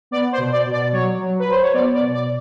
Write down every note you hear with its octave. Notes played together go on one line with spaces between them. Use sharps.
B3 D5
C5
B2
D5
B2
D5
F#3 C#5
F#3
B4
F#3 C5
C#5
B3 D5
D5
B2
D5